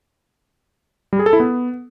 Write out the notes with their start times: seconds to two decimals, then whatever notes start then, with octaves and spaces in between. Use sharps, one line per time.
1.13 G3
1.19 G#4
1.26 A4
1.33 E4
1.40 B3